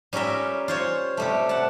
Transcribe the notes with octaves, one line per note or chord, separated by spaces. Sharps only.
G3 C#4 F4 A#4 E5
F4 C5 C#5
C3 G3 A3
F#5 A5